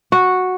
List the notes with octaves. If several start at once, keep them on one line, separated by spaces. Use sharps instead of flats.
F#4